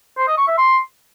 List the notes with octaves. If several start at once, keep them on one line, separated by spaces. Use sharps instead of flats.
C5
D#5
C#6
E5
C6